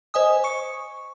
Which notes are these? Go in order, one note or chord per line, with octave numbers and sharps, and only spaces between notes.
C5 D#5 G#5 D#6
C#6 C#7